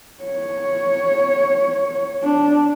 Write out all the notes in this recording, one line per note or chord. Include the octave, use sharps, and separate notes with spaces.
C#5
D4